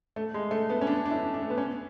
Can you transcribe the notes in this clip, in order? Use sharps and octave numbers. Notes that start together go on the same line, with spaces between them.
A3
G#3
A3
B3
C#4
D4
D4
E4
D4
A3
B3
C#4